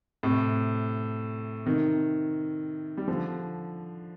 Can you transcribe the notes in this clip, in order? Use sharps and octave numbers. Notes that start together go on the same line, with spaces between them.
A2 C3
C3 D#3
G3
D3 F3